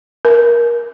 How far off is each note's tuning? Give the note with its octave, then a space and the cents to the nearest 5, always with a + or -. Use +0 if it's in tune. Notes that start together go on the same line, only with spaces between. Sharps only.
A#4 +20